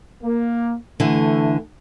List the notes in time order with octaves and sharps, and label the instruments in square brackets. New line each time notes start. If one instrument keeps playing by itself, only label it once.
[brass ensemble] A#3
[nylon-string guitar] D3 E3 [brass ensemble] A3